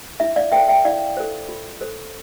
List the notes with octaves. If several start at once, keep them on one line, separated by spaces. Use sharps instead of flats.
E4 E5
D5 F5
A4 C5 E5 G5
E5 G5
E4 D5 F5
A4 C5
F4
A4 C5